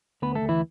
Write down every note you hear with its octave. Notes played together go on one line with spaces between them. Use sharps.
D2 B3 B4
A3 A4
D2
E3 E4